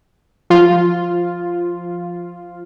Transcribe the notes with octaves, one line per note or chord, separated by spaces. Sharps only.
F3 F4